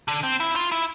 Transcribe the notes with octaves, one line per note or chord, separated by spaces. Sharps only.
D3
C4
E4
F4
E4